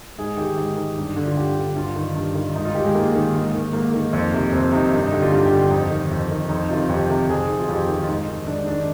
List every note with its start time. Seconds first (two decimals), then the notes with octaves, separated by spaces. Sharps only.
0.18 G#2 G#4
0.37 D#3 G4
0.57 G#2
0.77 D#3
0.98 G2
1.16 D3
1.26 F4
1.37 G2 G4
1.56 D3
1.76 G2 F4
1.96 D#3
2.16 G2
2.35 D#3
2.55 G#2 D#4
2.65 F4
2.74 D#3 G4
2.85 G#3
2.95 G#2 A#3
3.15 D#3
3.35 G#2
3.54 D#3
3.73 G#2 A#3
3.94 D#3
4.13 F2
4.33 C3 D#3
4.53 F2 C4
4.72 C3 D#3 D#4
4.92 G2 D#4
5.02 D#4
5.12 D3 G4
5.22 F4
5.32 G2 G4
5.40 F4
5.46 G4
5.52 D3
5.70 F2 D#4
5.90 D#3
6.11 F2
6.31 D#3
6.49 F2 D#4
6.69 C3 D#3 F4
6.89 F2 G4
7.10 C3 D#3
7.29 F2 G#4
7.48 D#3
7.59 F4
7.68 F2 G4
7.88 D#3
7.98 F4
8.07 G#2 D#4
8.27 D#3
8.47 G#2 D4
8.67 D#3 D4